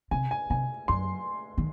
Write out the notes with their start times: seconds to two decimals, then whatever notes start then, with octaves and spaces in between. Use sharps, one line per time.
0.11 C3 G#5
0.31 G#5
0.50 C3 G#5
0.88 F#2 C6
1.58 D#3